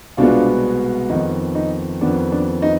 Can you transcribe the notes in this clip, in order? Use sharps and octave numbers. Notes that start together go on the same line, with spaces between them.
C2 B2 G#3 B3 D4 F4
F2 D#3 B3 D#4
D#4
F2 D#3 B3 D4
D4
D#4